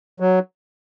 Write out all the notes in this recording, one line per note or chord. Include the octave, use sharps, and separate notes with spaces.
F#3